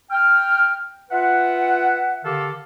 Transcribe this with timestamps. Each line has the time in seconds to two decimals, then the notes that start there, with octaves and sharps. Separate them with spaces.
0.11 G5 F6
1.11 F4 B4 E5 F#5
2.25 D3 D#3 G4 A4 F5 D6